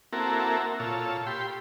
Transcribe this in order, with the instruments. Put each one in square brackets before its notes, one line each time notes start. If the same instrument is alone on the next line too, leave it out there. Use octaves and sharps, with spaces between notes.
[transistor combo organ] A#3 C4 E4 F#4 A4 A#4
A#2 F4 A4 C#5 E6
G4 G5 B5 C6